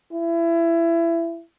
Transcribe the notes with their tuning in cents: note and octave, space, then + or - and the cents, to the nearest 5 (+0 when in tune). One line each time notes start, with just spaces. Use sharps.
E4 +25